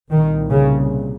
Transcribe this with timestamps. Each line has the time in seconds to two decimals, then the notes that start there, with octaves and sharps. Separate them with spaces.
0.11 C2 A#2 D#3
0.50 C#3